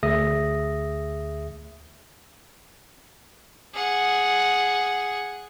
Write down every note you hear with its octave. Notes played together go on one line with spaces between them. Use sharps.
D2 G#4 E5 D#6 A#6
G#4 F#5